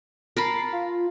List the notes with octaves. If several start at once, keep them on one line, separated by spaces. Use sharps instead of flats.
A#4 A5 B5 C7
F4